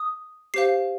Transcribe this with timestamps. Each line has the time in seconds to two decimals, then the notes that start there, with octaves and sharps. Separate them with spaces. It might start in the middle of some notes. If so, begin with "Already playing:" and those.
Already playing: D#6
0.54 G4 C5 F5 C7